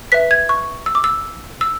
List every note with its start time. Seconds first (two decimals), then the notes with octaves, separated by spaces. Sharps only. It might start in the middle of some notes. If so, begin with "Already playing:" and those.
0.12 B4 E5 B6
0.31 G#6
0.49 C#6
0.86 E6
0.95 D6
1.04 E6
1.61 E6